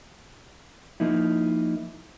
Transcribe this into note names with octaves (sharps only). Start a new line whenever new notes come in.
F3 A#3 D#4 E4